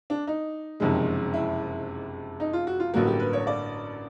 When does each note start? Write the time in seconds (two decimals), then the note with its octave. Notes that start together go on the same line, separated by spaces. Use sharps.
0.10 D4
0.27 D#4
0.80 F#1 F2 C3 D#3 G#3
1.34 E4
2.40 D#4
2.53 F4
2.67 F#4
2.80 F4
2.94 A1 G2 D3 F#3 A#3 F#4
3.07 G4
3.20 B4
3.33 C#5
3.47 D5